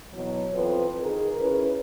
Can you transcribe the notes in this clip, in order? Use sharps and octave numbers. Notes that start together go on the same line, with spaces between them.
B2 E3 F#3
F2 E3 F3 B4
D#3 G#4 A#4
C#4 E4 B4